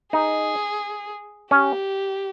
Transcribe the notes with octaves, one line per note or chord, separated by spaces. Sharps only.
D#4 G#4
C#4 G4